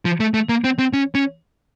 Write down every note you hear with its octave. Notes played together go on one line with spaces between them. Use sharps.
F3
A3
A3
A#3
C4
C4
C#4
C#4